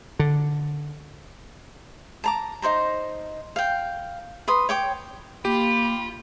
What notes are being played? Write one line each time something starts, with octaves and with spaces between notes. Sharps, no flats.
D3
A5 A#5 D6
D#4 A4 C5 A#5
F5 G5
B4 C6 D#6
C#5 G5 D6
A#3 F4 G4 B5